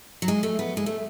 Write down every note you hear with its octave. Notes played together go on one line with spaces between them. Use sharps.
F#3
G#3
A3
B3
G#3
A3